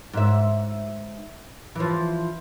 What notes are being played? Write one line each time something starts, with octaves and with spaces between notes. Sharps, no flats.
G#2 E5
E3 F3